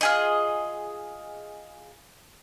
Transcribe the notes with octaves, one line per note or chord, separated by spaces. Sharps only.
F4 G#4 D#5